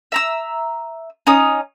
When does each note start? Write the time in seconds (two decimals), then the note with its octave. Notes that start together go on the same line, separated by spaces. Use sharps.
0.12 E5 A#5 E6
1.27 C#4 D#4 D#6